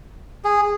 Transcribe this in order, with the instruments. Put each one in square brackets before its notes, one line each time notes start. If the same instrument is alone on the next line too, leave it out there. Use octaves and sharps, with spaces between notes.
[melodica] G#4